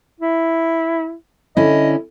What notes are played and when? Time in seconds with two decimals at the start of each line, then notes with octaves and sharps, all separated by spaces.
0.21 E4
1.57 D3 C#4 E4 D#5